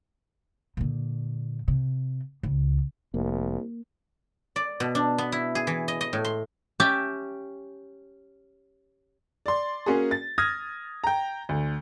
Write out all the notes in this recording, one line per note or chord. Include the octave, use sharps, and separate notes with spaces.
A#2 D3
C3
C#2
F1 C2 A#3
D5
B2
D4
B3
E4
G#4
E3
D#5
D#5
A2
C6
C#4 G4 E5 A5
D5 C6
A#3 C#4 F#4 G#4
A6
D#6 F6 G#6 A#6
G5 A#5
D2